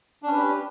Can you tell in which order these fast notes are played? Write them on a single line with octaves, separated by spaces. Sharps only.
D4 C#4 B4 G4